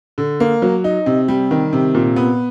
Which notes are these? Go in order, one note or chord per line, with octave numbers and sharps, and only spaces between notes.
D3
A#3
F#3
D#4
C3
G3
D#3
C3
A#2
B3